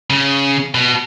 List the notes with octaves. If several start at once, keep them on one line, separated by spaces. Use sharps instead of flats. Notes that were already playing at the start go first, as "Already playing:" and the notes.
C#3
B2